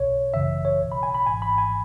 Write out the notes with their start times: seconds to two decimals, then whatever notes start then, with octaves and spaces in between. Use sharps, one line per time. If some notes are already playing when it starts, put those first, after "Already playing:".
Already playing: B1 B2 C#5
0.34 G#1 F#2 C#3 E3 E5
0.65 C#5
0.80 B1 B2
0.92 B5
1.03 G#5
1.15 B5
1.26 G#1 G#2 E3 G#5
1.42 B5
1.58 G#5